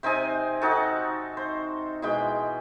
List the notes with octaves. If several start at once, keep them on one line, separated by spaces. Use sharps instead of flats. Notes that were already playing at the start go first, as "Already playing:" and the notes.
C3 C4 D#4 G#5
D#4 F#4 A4
C5
B2 E3 G#3 G5